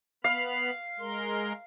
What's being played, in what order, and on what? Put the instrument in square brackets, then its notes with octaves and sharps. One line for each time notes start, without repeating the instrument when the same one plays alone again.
[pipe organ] B3 B5 F6 [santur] F5
[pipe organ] G#3 A#4 C6